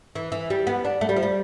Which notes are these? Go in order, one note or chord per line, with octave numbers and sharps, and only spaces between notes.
E3
E3
G3
B3
D4
A3
G3
F3
G3